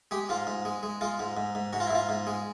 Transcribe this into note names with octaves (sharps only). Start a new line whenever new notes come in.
G#3 G4
G#2 F4
G#2
G#3
G#3
G#3 F4
G#2
G#2
G#2
G#2 F#4
F4
E4
G#2 F4
G#2
G#3